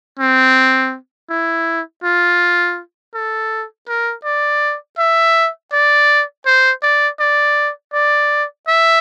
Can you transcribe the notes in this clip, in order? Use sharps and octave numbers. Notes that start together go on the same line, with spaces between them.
C4
E4
F4
A4
A#4
D5
E5
D5
C5
D5
D5
D5
E5